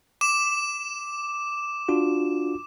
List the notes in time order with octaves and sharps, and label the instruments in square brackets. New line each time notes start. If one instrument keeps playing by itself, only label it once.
[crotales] D6 E7
[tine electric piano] D4 F4 F#4